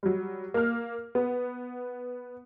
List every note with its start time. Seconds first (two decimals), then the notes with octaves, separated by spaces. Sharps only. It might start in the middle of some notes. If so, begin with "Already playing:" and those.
0.03 F#3 G3
0.54 A#3 F6
1.15 B3